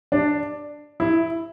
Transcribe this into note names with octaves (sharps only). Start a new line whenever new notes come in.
D4
E4